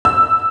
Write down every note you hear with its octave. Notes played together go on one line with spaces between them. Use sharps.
E6